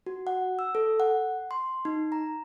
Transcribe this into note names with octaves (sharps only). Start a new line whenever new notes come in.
F#4
F#5
E6
A4
F#5
C6
D#4
A#5